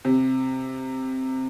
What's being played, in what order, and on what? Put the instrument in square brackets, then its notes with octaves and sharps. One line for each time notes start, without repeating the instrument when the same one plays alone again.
[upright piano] C3